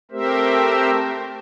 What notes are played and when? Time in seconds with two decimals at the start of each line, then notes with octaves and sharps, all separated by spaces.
0.11 A3 C4 G4 A#4 C5 E5